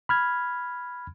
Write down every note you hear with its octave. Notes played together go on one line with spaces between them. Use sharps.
B5 F6 G#6